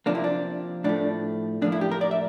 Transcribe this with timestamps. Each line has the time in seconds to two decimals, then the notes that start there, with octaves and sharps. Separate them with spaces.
0.06 C3 F3 A#3 D4
0.15 E4
0.24 D4
0.84 A2 F3 A3 D4
1.62 A2 F3 A#3 D4
1.72 E4
1.81 G4
1.92 A#4
2.01 D5
2.11 E5